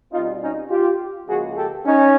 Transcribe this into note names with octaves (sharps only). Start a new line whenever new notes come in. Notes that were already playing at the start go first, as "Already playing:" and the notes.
B2 G3 C4 D#4 F4
C#4 D#4
F4 G4
C#2 C#3 F3 A#3 F#4 G#4
G4 A4
C#4 D#4